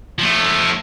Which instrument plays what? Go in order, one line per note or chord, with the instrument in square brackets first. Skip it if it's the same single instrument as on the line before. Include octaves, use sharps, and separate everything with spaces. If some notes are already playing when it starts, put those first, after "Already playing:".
[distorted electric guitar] F3 A3